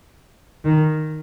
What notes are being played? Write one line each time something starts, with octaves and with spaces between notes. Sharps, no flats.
D#3